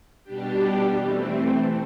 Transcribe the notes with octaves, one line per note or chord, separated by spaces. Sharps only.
B2 G3 D4 G4
E3 A3 C4